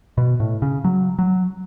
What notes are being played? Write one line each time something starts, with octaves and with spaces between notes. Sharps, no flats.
B2
A2
C#3
F#3
F#3